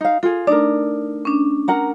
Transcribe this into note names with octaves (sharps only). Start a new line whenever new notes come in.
D#4 F5
F4 G#4 A4
A3 D4 D#4 A#4 D5
C#4 D4
A#4 F#5 A#5